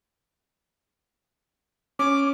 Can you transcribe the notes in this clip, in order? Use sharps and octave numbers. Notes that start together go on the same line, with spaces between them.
C#4 D6